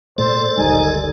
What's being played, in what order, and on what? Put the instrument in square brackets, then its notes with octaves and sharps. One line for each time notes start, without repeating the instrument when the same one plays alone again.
[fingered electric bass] A#2 A3 [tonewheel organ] A4 D5 [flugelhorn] C5
[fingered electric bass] F#1 D2 G#3 [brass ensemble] D#3 G3 G#5 [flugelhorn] D#4